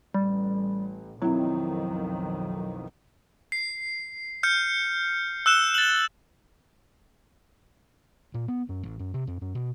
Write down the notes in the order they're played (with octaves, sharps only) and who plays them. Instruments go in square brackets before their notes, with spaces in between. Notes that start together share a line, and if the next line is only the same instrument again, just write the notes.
[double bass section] A1 [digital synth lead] G3
[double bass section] B1 F2 D#3 [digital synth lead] F#3 [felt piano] C4 E4
[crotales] C7
F6 G6 C#7
E6 F#6 E7 G7
A6 F#7
[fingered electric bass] A#2
B3
F#2
A1
F#2
C3
F2
F#2
B2